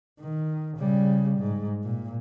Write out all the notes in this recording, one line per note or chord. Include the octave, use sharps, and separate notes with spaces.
D#3
C#3 G3
G#2
A#2